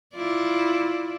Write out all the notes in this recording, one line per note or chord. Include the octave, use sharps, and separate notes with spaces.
E4 F4 D5